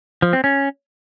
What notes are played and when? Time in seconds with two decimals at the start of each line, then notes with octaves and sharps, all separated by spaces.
0.22 F3
0.33 C4
0.44 C#4